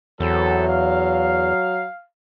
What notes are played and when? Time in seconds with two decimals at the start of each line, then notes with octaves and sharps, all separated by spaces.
0.20 E2 F#3 B3 C4 A4
0.68 F5